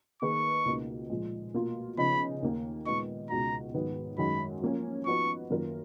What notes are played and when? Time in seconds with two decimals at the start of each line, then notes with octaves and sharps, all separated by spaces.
0.22 D#3 A#3 D#4 G#4 B4 C#6
0.65 C#2 B2 A#3 D#4
1.09 A#2 F3 G#3
1.54 B2 A#3 F4
1.97 C#3 F3 B3 D#4 B5
2.43 D#2 D#3 A#3
2.86 A#2 G#3 B3 D#4 C#6
3.30 C#2 B2 G#3 D#4 F#4 A#5
3.74 G#2 D#3 F#3 B3
4.18 F#2 D#3 G#3 D#4 F#4 B5
4.62 F3 A#3 C#4
5.06 F3 B3 D#4 F#4 B4 C#6
5.50 F#2 D#3 A#3 F4 A#4